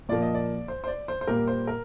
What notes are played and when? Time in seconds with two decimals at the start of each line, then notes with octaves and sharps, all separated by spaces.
0.09 A#2 F3 A#3 D5
0.22 D#5
0.35 D5
0.68 C5
0.84 C5
0.88 D5
1.08 C5
1.21 C5
1.27 A#2 G3 A#3 A#4
1.48 C5
1.67 A#4